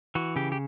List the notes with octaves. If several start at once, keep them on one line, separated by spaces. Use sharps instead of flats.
E3 F#4
C#3 G4
G4